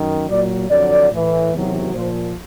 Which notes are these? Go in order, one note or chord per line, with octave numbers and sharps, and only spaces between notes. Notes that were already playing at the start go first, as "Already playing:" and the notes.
Already playing: F#2 D#3
A#2 F#3 D5
F2 D3 F#3 D5
A2 E3
E2 C3 D#3 F#3
A#2 F3 C5